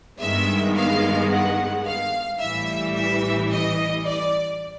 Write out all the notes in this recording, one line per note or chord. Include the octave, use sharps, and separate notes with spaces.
G2 D#3 G#3 B3 E5
F5
F#5
F5
A1 A2 E3 G3 E5
E5
D#5
D5